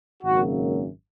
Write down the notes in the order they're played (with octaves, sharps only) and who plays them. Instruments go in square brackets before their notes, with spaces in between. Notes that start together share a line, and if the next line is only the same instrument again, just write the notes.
[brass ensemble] G#1 F#2 C#3 F#3 A#3 F#4